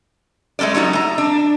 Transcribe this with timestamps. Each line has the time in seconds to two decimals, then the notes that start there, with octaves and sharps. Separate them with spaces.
0.59 G#3 A3 C#4 A4 D5
0.75 F#3 G3 D#4 F#4
0.93 A3 A#5
1.18 D4